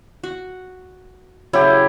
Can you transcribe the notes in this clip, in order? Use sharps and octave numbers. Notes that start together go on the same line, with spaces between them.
F#4
C#3 F#3 E4 G4